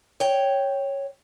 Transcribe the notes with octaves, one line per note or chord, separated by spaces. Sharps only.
C#5 G5